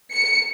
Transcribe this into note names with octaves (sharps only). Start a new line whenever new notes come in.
C#7